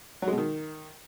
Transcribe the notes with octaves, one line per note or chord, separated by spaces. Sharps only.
F#3
G#3
B2
D#3